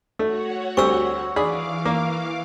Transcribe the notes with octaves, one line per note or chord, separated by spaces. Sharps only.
A3 F#4 C#5 F#5
D2 G3 C4 C#6 E6
E3 D4 G#4 F5 B5 D6
A#3